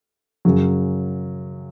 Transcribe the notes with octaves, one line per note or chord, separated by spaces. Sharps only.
F#2 C#3 F#3